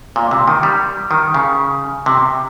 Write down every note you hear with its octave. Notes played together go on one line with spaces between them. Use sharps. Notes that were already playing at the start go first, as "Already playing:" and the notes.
A#2
C3
D#3
G3
D#3
C#3
C3